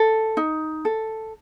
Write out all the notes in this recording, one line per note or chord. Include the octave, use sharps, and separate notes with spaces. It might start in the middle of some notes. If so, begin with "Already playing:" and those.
Already playing: A4
D#4
A4